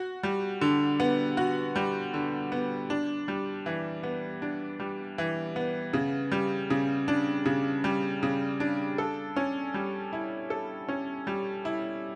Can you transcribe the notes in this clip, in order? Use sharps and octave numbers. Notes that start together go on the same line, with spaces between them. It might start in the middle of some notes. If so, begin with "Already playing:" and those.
Already playing: F#4
G3
D3
B3
F#4
G3
D3
B3
D4
G3
E3
B3
D4
G3
E3
B3
C#3
G3
C#3
D4
C#3
G3
C#3
D4
A4
C#4
G3
E4
A4
C#4
G3
E4